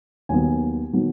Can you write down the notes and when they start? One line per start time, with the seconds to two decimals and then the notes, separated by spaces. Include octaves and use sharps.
0.29 D#2 D#3 F#3 B3 G#5
0.93 D#3 F#3 B3